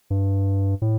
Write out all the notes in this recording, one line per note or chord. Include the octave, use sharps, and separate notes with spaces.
G2
A2